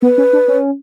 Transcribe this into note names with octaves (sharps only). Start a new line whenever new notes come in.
B3 B4
C#4
D4
C#4